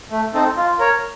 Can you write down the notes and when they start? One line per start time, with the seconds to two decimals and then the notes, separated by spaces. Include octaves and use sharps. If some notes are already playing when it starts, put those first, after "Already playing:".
0.11 A3
0.34 C4 D#4 A4
0.56 F4
0.79 A#4 C#5